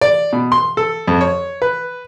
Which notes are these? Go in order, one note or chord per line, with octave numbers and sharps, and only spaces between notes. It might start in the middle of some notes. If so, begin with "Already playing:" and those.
D5
B2
C6
A4
F2
C#5
B4